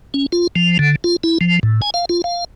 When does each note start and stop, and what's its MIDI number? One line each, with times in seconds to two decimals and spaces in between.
0.14 0.26 61
0.32 0.47 65
0.56 0.78 53
0.79 0.96 50
1.04 1.16 65
1.24 1.38 64
1.41 1.59 53
1.63 1.81 45
1.82 1.90 80
1.94 2.05 77
2.09 2.22 65
2.24 2.44 77